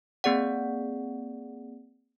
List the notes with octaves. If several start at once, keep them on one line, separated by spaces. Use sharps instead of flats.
A#3 C4 G#4 D5 F#5